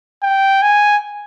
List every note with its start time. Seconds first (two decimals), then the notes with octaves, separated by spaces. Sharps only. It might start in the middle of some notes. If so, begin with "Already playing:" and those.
0.23 G5
0.62 G#5